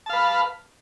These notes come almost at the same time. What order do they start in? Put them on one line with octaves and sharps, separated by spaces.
A5 F5 B4